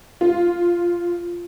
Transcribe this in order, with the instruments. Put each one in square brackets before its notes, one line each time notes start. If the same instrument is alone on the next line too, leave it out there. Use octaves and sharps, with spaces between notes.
[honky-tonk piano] F4